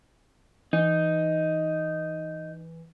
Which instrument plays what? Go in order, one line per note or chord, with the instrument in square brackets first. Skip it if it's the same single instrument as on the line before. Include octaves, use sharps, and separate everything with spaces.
[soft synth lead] E3 [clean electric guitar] D#4